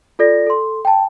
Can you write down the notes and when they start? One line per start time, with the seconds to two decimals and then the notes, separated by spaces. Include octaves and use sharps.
0.19 F4 A4 D5 A#6
0.47 A4 C6
0.85 G5 A5